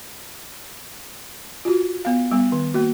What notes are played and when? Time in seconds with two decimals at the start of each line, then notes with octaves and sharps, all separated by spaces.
1.65 F4 F#4
2.05 B3 F5
2.31 G3 B3
2.52 D#3
2.74 A#3 F#4